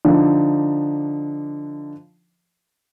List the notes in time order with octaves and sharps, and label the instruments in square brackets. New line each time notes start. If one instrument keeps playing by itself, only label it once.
[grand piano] D3 F3 D4 D#4